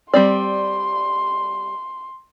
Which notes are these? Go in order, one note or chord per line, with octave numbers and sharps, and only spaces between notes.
G3 C4 D5 C6